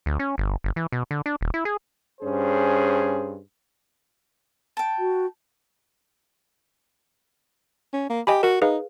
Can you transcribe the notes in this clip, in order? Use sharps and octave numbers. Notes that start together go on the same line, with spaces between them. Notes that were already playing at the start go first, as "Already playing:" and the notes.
D2
C#4
G1
G1
E3
B2
D3
D4
D#1
E4
G#4
G2 C#4 G#4 C5
G5 A5
F#4
C#4
A#3
G4 D#5 G#5 B5
F#4 A#4
D#4 G#4 B4 F5